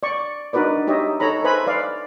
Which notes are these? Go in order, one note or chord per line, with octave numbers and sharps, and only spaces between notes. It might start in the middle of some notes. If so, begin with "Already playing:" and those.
D5 C#6
D4 D#4 F#4 A#4 B4 D5
D#4 G4 C#5 D#5 E5
D#4 A4 C#5 A#5 B5
B4 C5 E5 G#5 B5
B4 D5 F5